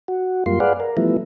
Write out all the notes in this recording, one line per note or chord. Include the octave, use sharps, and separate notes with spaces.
F#4
F#2 G3 A#3 F4 C6
G#4 B4 D5 F5 F#5
A#4
E3 F3 G3 A3 B3 E4